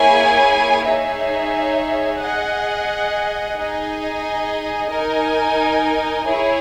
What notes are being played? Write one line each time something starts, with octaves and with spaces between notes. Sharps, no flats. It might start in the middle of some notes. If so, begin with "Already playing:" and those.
Already playing: A#3 E4 G#4 C#5 G#5
D#4 G#4 C#5 E5
G#4 D#5 F#5
D#4 G#4 D#5
D#4 A#4 D#5 G#5
E4 G#4 C#5